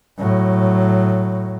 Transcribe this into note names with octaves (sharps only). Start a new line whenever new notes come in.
A2 F#3